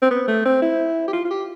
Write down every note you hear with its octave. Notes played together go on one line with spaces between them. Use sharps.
C4
B3
A3
C4
E4
G4
F4
F4
G4